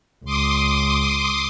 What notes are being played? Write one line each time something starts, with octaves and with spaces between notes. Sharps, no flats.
C#2 C6 D6 D#6